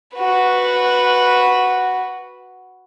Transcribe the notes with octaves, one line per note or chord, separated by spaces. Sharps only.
F#4 B4